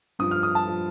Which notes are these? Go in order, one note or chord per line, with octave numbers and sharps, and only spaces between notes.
G2 F3 D#6
F6
D#6
A5
F3